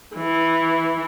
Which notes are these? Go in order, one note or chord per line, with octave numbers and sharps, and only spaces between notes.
E3